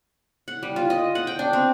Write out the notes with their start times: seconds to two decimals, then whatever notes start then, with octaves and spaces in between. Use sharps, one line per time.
0.48 F#5
0.63 G3
0.76 F4
0.90 D#5
1.15 F#5
1.27 G5
1.39 D4
1.53 C4